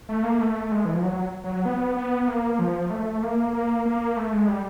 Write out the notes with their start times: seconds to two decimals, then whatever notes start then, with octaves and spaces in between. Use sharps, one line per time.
0.09 A3
0.24 A#3
0.40 A3
0.72 G#3
0.85 E3
0.94 F3
1.03 F#3
1.44 F#3
1.65 B3
1.97 B3
2.28 A#3
2.59 F3
2.91 A3
3.23 A#3
3.53 A#3
3.85 A#3
4.17 A3
4.33 G#3
4.48 G3